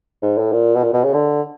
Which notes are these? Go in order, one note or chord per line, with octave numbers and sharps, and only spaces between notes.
G#2
A2
A#2
B2
A#2
B2
C#3
D3